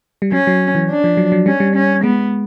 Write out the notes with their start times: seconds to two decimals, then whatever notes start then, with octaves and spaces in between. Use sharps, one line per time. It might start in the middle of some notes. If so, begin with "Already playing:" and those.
0.22 G3
0.32 F#3 C#4
0.47 F#3
0.75 E3
0.89 D4
1.04 F3
1.17 F#3
1.32 F#3
1.46 G3 C#4
1.60 G3
1.75 C#4
2.03 G#3 B3